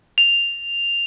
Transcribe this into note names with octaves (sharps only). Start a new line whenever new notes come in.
F7